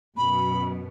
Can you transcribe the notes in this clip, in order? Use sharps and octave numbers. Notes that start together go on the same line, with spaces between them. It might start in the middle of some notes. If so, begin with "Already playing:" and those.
F#2 B2 B5